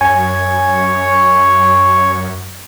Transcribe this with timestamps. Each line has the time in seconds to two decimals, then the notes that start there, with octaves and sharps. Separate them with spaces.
0.01 F#2 C#5 G#5 C#6